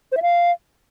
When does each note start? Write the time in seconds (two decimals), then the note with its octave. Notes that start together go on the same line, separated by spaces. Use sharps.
0.12 C5
0.17 E5
0.22 F5